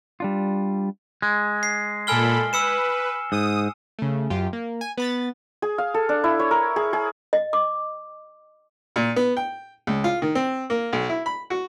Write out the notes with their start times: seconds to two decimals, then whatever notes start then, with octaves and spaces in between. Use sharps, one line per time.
0.20 G3 D4 F4
1.22 G#3
1.63 C7
2.07 A#2 A4 G#5 B5 F6 G7
2.53 B4 E6 C#7 E7
3.32 G#2 D#6
3.99 C#3 A3
4.30 F#2 F4 G4
4.53 A#3
4.81 G#5
4.97 B3 B5 A6
5.62 G#4
5.78 F5
5.94 A4
6.09 D4
6.24 E4
6.39 C#5
6.51 A#4
6.76 G#4
6.93 G#4
7.33 D#5
7.53 D6
8.96 A#2
9.16 B3
9.37 G5
9.87 C#2
10.04 F4
10.22 D#3
10.35 C4
10.70 A#3
10.93 B1
11.09 E4
11.26 B5
11.50 F#4